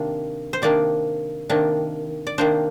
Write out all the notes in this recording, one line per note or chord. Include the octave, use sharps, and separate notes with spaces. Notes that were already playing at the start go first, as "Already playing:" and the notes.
Already playing: C3 D#3 A#3 D4
C5
C3 D#3 A#3 D4 D5
C3 D#3 A#3 D4
D5
C3 D#3 A#3 D4 C5